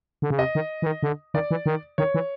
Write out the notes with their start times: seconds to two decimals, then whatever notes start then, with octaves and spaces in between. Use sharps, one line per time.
0.22 D3
0.30 C#3
0.39 C3 D#5
0.55 D#3
0.82 E3
0.86 D#3
1.03 D3
1.34 D#3 D5
1.51 E3
1.66 D#3
1.98 D#3 C#5
2.14 E3